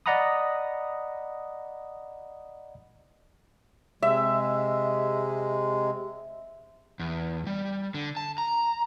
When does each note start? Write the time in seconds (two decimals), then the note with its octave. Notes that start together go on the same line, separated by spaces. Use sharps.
0.06 D5 D#5 F#5 A#5 B5 D#6
4.02 C3 G#3 E5
7.00 E2
7.47 G3
7.94 D3
8.17 A5
8.38 A#5